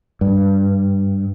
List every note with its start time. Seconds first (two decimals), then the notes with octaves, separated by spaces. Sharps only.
0.21 G2